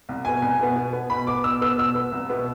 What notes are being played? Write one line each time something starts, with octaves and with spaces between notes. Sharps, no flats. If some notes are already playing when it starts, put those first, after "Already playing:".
C2
B2 B3 G#5
C2 G#5
B2 B3
B2
B3
B2 B5
B3 D6
B2 E6
B3 E6
B2 E6
B3
C2
B2 B3